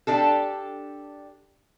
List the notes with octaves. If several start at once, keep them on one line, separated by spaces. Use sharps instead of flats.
D4 G4 A4